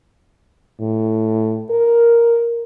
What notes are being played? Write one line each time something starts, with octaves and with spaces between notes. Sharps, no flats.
A2
A#4